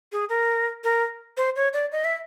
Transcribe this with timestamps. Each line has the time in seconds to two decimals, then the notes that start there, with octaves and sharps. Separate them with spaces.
0.12 G#4
0.29 A#4
0.84 A#4
1.37 C5
1.56 C#5
1.73 D5
1.92 D#5
2.05 E5